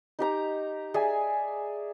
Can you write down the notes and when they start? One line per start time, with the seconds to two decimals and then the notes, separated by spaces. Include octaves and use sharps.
0.19 D#4 G4 A#5
0.94 G#4 D5 E5 G#5